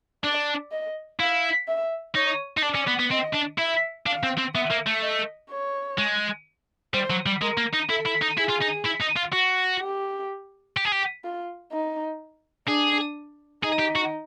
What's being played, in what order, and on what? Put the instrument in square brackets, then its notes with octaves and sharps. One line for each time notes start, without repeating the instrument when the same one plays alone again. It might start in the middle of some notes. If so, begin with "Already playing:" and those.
[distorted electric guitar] D4 [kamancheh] D5
[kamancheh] D#5
[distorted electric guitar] E4 [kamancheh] F5
[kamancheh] E5
[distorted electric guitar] D#4 [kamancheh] C#5
[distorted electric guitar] D#4
[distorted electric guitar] D4 [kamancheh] D5
[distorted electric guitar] C#4
B3
B3
[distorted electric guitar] C4 [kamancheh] D#5
[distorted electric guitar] D4
[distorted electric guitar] E4 [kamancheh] E5
[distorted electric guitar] D4 [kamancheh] F5
[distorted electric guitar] C4
C4
[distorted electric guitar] B3 [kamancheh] E5
[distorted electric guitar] A#3
A3
[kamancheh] D#5
C#5
[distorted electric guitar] G#3
[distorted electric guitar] G3 [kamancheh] C5
[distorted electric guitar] F#3
G3
[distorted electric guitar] G#3 [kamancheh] A#4
[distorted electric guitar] A#3
D#4
[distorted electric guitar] E4 [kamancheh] A4
[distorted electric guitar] E4
D#4
[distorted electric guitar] E4 [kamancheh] G#4
[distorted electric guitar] F4
D#4
E4
D#4
F4
F#4
[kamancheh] G4
[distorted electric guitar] G4
G#4
G4
[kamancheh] F4
D#4
[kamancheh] D4 [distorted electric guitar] G#4
[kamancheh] D#4 [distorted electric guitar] G#4
[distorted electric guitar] G4
F#4